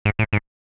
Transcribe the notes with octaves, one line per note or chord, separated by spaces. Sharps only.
G#2
A2
G#2